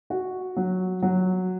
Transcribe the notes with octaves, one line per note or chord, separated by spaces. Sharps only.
F#4
F#3
F#3